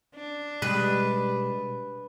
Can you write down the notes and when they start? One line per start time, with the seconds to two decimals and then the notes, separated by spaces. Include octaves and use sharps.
0.15 D4
0.62 B2 G3 G#3 G4 B4